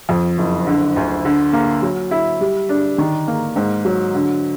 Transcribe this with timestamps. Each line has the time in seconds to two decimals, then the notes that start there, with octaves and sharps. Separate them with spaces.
0.09 F2
0.38 F#1
0.67 D3
0.96 D2
1.25 D3
1.53 A#3
1.82 F#3
2.11 E4
2.40 G3
2.69 D4
2.98 D#3
3.28 A#3
3.56 G#2
3.85 F#3
4.15 D3